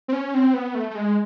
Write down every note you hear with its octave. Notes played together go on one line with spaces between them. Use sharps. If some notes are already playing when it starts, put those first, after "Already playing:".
C4
C#4
C4
B3
A3
A3
G#3